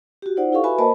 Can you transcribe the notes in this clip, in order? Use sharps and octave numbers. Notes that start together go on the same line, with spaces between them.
F#4 G4
D#4 F4 C5 D5 F#5
E4 G4 A4 F5 C#6
F#4 B4 E5 G#5 B5
A#3 A#4 C5 D#5 A5 B5